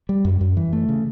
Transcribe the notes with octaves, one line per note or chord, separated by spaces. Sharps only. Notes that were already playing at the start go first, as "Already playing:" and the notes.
G3
F#2
F#2
E3
A3
C#3